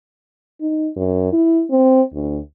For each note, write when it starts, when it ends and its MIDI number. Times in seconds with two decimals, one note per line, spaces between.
0.61 0.90 63
0.96 1.31 42
1.32 1.64 64
1.70 2.02 60
2.13 2.38 38